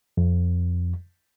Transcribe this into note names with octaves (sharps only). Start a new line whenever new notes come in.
F2